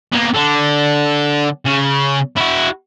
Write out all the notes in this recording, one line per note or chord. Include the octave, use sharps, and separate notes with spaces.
A#3 B3
D3 D4
C#3
E4 F#4